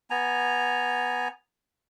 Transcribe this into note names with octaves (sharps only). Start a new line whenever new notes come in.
B3 G#5 A#5